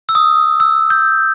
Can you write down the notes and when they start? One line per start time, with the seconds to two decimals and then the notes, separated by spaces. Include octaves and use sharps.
0.09 E6
0.15 D#6
0.60 E6
0.90 G6